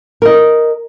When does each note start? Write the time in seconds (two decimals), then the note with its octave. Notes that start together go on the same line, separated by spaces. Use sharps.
0.22 A#4 D#5